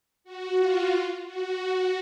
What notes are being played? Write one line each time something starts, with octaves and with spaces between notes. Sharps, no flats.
F#4
F4
F4
F#4